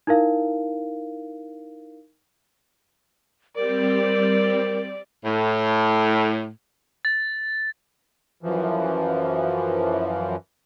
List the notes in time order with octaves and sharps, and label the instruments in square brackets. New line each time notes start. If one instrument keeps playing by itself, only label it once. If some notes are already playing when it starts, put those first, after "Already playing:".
[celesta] D#4 E4 A#4 F5
[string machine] G3 C4 G4 [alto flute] A#4 [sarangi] D5
[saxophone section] A2
[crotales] A6
[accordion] F#2 E3 F3